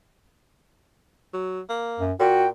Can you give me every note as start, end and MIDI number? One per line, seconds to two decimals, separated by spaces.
1.33 1.60 54
1.69 2.04 58
1.99 2.12 42
2.20 2.49 46
2.20 2.47 66
2.20 2.48 79